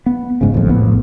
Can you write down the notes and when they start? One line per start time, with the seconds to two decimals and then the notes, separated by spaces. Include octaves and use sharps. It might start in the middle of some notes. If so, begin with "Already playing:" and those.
0.06 B3
0.41 F#1 G#2 C#3
0.54 A1 F2
0.69 A#1 A2 B3